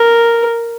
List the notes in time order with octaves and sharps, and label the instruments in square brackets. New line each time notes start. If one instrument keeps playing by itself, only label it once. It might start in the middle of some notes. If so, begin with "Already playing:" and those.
Already playing: [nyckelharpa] A#4